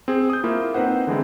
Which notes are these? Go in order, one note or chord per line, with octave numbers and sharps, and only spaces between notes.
C4 G#4
D#6 G6
A#3 E4 F4
C4 D#4 B4 C5 F#5
D3 E3 G#3 C4